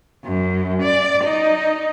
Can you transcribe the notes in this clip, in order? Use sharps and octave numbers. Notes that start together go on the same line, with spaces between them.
F#2
D5
D#4